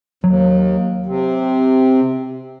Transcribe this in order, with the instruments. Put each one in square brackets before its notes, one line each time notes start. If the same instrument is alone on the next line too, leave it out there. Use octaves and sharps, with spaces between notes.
[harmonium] D#2 [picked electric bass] F#3
[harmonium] C3